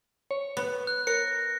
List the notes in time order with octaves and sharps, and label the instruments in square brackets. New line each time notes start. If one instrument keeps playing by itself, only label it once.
[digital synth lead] C#5
[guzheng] B3
[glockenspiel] F#6
[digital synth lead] A#4 [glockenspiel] F#6 A#6 C#7